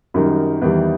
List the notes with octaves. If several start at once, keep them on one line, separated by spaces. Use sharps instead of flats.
F#2 D#3 G3 D#4
E2 D#3 G3